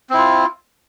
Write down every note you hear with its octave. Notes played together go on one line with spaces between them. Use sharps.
C4 E4 F4